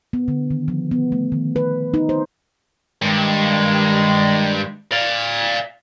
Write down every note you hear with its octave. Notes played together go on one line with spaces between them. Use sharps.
B3
D3
D#3
F3
B3
A3
D#3
B4
D#4
C5
G2 D#3 G#3
D5 F5